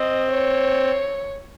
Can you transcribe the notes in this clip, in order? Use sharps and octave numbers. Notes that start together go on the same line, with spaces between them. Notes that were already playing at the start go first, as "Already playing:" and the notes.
Already playing: C4 D#5
C#5